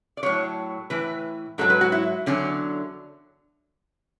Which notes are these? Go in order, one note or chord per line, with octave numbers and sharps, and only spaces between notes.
D5
A2 F#3 C#5
A2 E3 B4
G#2 F#3 A4
B4
F#4
E4
E2 D3 F#3 C#4